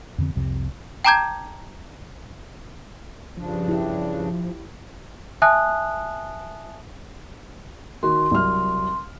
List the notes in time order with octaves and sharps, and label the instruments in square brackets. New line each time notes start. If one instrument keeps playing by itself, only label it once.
[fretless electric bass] F2 D3 C4
C2 F2 C3
[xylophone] G5 A5 A#5 D6 G6 G#6
[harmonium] G2 C#3 D4 [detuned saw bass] F3
[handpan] E4 G4
[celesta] E5 G#5 A5 D#6 F#6
[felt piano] D#3 F#4 [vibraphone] C6
[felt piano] C2 F#3 F6